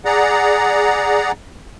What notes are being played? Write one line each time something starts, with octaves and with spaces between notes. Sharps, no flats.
G#4 D5 F#5 A#5